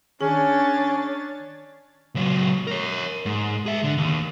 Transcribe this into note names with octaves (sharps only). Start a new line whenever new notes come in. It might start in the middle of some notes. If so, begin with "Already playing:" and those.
D#3 C#4 D4 G#4 C#5 A6
C#2 F#3
A#4 C#5
G#2
G#4 E5
D3
D#2